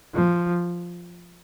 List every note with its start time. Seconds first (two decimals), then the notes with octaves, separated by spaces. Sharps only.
0.14 F3